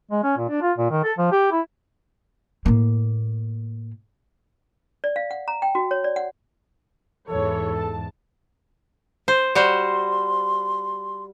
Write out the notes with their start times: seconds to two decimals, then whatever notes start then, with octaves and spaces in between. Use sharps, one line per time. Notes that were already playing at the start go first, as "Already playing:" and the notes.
0.11 G#3
0.23 C#4
0.37 A#2
0.49 D4
0.62 F4
0.78 A#2
0.91 D#3
1.04 A4
1.18 F3
1.32 G4
1.52 E4
2.66 A2 A#3
5.04 D5
5.16 F5
5.31 F#5
5.48 A#5
5.62 G5
5.75 F#4
5.91 C#5
6.04 D5
6.16 F#5
7.28 E2 G#2 E3 A4 C#5
7.75 A5
9.28 C5
9.55 G3 F#4 C5 C6